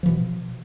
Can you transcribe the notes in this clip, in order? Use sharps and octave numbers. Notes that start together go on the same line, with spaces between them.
B2 E3 F3